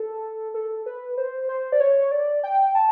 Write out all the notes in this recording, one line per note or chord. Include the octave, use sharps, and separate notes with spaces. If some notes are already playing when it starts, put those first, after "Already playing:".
Already playing: A4
A4
B4
C5
C5
D5
C#5
D5
G5
A5